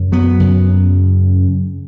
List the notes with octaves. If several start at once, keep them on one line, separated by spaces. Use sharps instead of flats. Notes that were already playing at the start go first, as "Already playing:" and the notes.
Already playing: F#2 C#3
F#3 B3
F#2 C#3